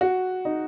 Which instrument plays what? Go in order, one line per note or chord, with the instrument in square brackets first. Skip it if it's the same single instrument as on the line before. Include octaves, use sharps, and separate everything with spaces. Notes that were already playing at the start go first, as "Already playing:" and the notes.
[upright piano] F#4
D#4